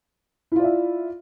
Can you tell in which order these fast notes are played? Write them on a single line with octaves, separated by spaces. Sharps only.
E4 F4 D5 E5